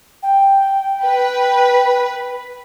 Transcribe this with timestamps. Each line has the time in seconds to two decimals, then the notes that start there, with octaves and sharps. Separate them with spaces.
0.23 G5
1.04 B4